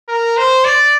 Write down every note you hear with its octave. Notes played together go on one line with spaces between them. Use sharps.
A#4
C5
D5